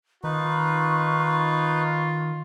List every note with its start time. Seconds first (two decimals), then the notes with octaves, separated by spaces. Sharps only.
0.24 D#3 D#4 F4 B4 C#6